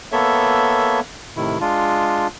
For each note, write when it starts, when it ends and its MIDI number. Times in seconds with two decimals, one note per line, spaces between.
0.12 1.00 58
0.12 1.00 59
0.12 1.00 69
0.12 1.00 73
0.12 1.00 76
1.36 1.58 45
1.36 1.58 48
1.36 1.58 51
1.36 1.58 64
1.61 2.27 56
1.61 2.27 62
1.61 2.27 65